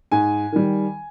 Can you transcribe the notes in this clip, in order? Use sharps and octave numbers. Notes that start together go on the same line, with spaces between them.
G#2 G#5
D#3 G3